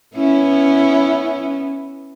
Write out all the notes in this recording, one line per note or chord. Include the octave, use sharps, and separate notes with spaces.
B3 C#4 E4